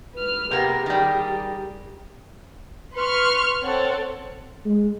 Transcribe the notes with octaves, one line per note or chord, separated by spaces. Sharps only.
B4 F6
C3 A#3 B3 G4 G#4
D#3 G3
B4 C6 C#6 F6
C4 A4 C#5 F#5
G#3